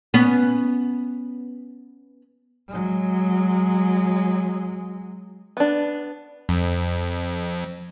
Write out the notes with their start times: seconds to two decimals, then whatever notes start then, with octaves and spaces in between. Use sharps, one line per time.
0.14 B3 C#4
2.68 F#3 G#3
5.57 B3 D4
6.49 F2